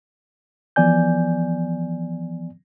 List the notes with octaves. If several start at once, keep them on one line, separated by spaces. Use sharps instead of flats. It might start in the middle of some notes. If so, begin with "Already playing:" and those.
E3 F3 B3 D5 G#5 G6